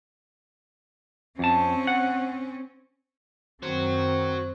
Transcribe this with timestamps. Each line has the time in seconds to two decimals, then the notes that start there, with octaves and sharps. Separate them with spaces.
1.39 F2 C4 C#4 A5
1.87 F#5
3.63 F#2 D#3 C4 F#4 C5 C#5